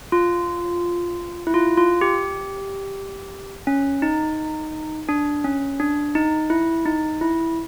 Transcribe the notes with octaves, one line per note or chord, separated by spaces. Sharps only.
F4
E4
F4
F4
G4
C#4
D#4
D4
C#4
D4
D#4
E4
D#4
E4